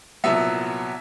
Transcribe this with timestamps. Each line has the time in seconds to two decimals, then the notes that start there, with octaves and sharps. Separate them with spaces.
0.24 C2 A#2 F#3 B3 E5